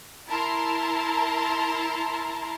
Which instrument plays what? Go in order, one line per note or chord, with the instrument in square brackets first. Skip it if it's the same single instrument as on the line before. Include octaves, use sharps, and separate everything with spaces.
[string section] E4 A#4 A5 A#5 C6